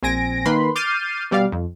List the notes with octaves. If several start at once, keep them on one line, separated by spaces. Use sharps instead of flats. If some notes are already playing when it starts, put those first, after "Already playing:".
A#1 C4 G#5 A#6 D7
D#3 A#3 B4 B5 C6
D6 F6 G6 A6 C7 D#7
B2 G3 D5 F5
F2